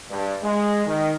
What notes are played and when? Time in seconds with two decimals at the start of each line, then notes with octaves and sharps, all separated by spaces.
0.11 G2
0.43 G#3
0.87 D#3